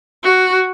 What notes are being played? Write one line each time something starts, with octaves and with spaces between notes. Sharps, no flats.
F#4